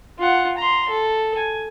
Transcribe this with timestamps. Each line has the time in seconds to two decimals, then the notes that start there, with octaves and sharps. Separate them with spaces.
0.19 F4 F#5
0.57 A#5 C6
0.89 A4
1.36 G#5